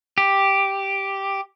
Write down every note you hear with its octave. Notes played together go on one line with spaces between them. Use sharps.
G4